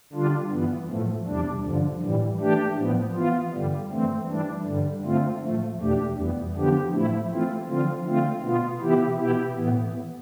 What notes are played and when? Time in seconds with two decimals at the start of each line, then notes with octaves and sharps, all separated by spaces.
0.13 D3 G3 D4 F4
0.51 G2 E3 B3
0.89 A2 F3 A3
1.27 E2 C3 G3 D4
1.64 G2 D3 F3
2.02 A2 E3 G3
2.40 E3 A3 D4 G4
2.77 A2 F3 B3
3.15 E3 B3 F4
3.53 G2 D3 G3
3.91 G2 E3 A3 C4
4.28 E3 G3 D4
4.66 G2 D3 G3
5.03 D3 A3 C4 F4
5.42 A2 F3 A3
5.79 E2 B2 A3 D4 G4
6.17 F2 E3 G3 B3
6.55 D3 F3 B3 D4 G4
6.92 A2 F3 A3 E4
7.29 E3 A3 C4 F4
7.67 D3 F3 C4 F4
8.05 D3 A3 C4 F4
8.43 B2 B3 F4
8.80 C3 E3 B3 E4 G4
9.18 B2 B3 E4 G4
9.56 A2 E3 B3